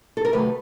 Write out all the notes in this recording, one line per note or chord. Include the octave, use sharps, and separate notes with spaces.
A4
A#4
C3 D#3 F#3 A3 B4